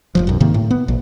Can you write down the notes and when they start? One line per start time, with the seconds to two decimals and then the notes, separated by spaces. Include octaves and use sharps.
0.15 F1 A#1 F3
0.27 B1 F#2
0.40 G#2 C3 D#3 A#3
0.54 A2
0.71 B3
0.88 A#1